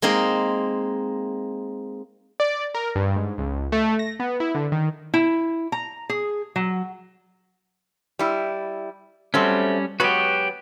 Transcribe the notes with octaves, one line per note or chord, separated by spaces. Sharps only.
G#3 A#3 C4 D#4 A#4
D5
A#4
G2
G#2
C#2
A3
A#6
B3
E4
D3
D#3
E4
A#5
G#4
F#3
G3 E4
F#3 G3 A3 C4 C#4
F#3 G#3 B3 F#4 G4